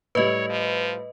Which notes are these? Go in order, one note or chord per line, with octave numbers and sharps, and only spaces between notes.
A2 G3 B4 C#5 D#5
F3